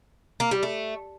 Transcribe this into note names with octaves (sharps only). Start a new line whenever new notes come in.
A#3
G3
A3